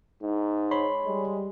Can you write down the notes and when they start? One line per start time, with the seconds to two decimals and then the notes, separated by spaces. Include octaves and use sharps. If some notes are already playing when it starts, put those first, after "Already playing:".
0.23 G#2 D#4
0.71 C#5 B5 C6
1.05 G3 G#3